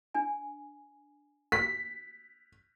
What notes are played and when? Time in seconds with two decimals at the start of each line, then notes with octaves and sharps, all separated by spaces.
0.14 D4 G#5
1.52 B6